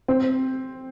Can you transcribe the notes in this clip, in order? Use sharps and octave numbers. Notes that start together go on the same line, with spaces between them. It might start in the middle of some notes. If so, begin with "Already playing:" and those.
C4